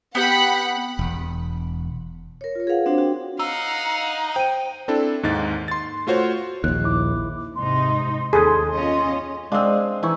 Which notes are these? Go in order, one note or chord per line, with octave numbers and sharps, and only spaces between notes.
B3 G4 F#5 B5
E1
A#4 C#5
F4 C#5
G#4 A#4 B4 F5 F#5
C4 D4 F#4 C5
D4 F#4 G5
D#4 F5 F#5 E6
C5 G5 D#7
C4 D4 E4 A4
D#2 G#2 D#4 A6
C6 A6
A3 F4 F#4 C5 C#5
A#1 D#2 F#6
E4 D6
G#2 C3 D#4 C6
D#2 G#4 A4
C#4 F4 D#5
G#3 C4 D4 G#4 F5 D#6
E3 D#4 E4 G#5 C#6